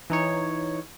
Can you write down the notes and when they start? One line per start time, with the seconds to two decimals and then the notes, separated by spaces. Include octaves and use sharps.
0.10 E3 D#4 C#5